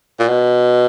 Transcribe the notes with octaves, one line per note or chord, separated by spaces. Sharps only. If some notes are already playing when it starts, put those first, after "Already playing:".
A#2
B2